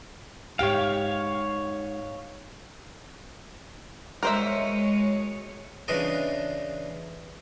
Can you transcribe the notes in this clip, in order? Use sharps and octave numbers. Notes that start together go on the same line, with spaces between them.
G#2 G4 C#5 F5 G5
G#3 F#4 A#4 C5 C#5 E5
C#3 E3 D4 F4 D5 D#5